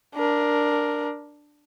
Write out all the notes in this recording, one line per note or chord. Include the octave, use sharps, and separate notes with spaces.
D4 A#4